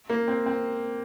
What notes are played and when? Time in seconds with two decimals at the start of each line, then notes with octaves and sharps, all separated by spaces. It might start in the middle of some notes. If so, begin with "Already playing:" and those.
0.10 A#3
0.28 C4
0.46 C4